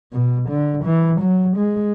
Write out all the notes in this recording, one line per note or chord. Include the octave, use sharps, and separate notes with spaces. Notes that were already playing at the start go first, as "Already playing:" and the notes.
B2
D3
E3
F#3
G#3